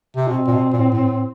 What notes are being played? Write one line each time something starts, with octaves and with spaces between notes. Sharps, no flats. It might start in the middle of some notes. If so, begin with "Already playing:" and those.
C3
B2 C4
A#2
B2
A#2
A2
A2
A2